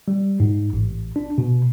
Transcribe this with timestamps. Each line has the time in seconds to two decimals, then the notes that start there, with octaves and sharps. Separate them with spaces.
0.08 G3
0.40 G#2
0.73 A1
1.16 D4
1.38 B2